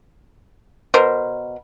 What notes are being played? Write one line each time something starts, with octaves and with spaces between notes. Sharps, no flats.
B2 A#4 C5